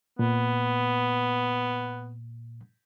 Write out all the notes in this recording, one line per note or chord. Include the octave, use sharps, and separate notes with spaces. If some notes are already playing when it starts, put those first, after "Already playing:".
A#2 B3